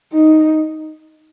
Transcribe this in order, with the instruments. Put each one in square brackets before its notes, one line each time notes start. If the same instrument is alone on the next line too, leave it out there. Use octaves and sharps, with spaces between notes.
[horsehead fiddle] D#4